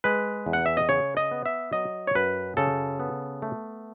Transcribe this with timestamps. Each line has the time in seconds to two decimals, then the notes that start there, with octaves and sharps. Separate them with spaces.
0.04 G#3 B4
0.46 E2
0.53 F#5
0.66 E5
0.77 D#5
0.89 C#3 C#5
1.17 D#5
1.32 B3
1.46 E5
1.73 F#3 D#5
2.07 C#5
2.15 F#2 B4
2.57 C#3 A4
3.00 B3
3.42 A3